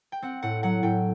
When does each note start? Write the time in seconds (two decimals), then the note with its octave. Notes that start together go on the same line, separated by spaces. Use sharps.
0.12 G5
0.22 C4 F#5
0.42 A2 F#5
0.63 F#3 F#5
0.83 A2 G5